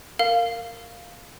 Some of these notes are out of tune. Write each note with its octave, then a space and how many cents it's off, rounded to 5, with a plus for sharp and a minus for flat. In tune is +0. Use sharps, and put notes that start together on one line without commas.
A#4 -15 F5 +0